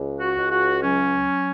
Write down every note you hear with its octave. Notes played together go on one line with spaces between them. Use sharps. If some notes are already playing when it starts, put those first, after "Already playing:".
Already playing: C#2
F#4
C#2
F#4
F#3 C#4